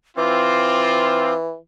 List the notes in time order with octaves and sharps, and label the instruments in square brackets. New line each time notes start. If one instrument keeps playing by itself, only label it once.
[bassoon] E3 [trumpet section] C4 F4 [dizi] D6